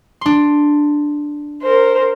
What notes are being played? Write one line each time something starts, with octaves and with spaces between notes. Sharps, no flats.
D4 C6
A#4 C5